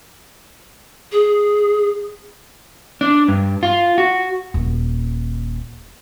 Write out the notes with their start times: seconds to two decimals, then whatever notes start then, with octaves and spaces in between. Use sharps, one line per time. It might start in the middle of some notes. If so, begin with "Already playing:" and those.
1.12 G#4
3.01 D4
3.28 G2
3.63 F4
3.98 F#4
4.54 D#1